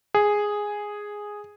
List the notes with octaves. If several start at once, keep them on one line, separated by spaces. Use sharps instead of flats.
G#4